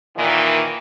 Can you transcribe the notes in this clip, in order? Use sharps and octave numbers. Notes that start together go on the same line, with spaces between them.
A#2 D#3 E3